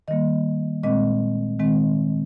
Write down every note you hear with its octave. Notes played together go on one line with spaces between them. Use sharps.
D#3 G3 A#3 D#5
A#2 G#3 C4 D#5
D#3 G#3 C4